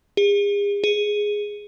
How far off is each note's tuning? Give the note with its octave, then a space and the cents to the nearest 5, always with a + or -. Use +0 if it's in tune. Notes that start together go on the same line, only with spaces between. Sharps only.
G#4 -40
G#4 +0